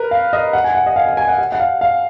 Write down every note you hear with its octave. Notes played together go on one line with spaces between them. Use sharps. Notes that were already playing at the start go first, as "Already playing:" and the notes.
Already playing: A#4 B4
F5
D#5
F#5
G#5
F#5
D#5
F5
F5
G#5
F#5
F#5
F#5
F5
F5